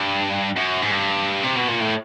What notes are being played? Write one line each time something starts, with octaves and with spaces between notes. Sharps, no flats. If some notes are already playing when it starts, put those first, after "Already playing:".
Already playing: G2
F#2
G#2
G2
C3
B2
A#2
A2